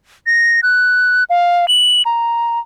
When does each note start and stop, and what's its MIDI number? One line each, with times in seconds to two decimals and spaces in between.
0.27 0.60 94
0.63 1.24 90
1.30 1.68 77
1.68 2.02 102
2.05 2.59 82